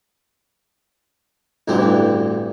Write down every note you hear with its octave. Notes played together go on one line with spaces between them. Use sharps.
A1 D2 G2 E3 C4